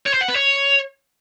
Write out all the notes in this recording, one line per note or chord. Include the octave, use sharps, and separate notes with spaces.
C#5
C5
F#5
B4
C#5